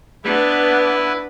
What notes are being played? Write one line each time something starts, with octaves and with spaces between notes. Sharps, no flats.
B3 D4 E4 B4